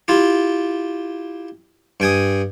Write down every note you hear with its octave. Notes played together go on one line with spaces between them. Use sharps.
E4 F4 G4
G2 G5 G#5 D#6